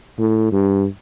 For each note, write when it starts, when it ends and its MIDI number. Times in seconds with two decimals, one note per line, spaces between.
0.19 0.50 45
0.52 0.86 43